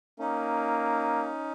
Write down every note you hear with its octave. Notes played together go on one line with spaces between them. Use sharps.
A#3 C#4 D#4